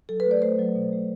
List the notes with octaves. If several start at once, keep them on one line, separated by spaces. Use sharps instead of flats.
F#3 A4
B4
A3
D5
A3 C5
F#3
B2
A3